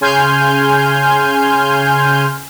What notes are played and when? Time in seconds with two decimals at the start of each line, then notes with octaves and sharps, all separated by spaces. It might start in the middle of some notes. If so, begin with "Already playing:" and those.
0.01 C#3 G#5 C6 F6 G6